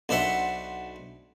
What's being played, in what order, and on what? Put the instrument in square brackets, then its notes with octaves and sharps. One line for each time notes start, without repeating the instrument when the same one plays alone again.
[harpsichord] B1 D4 C5 E5 F#5